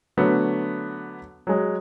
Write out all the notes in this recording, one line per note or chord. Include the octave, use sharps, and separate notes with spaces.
D3 F#3 A3 B3
F#3 G#3